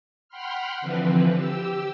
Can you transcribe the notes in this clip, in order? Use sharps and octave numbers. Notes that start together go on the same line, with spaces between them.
F#5 G5 B5 C6 F6
D3 E3 F3 C4 B4
G4 E6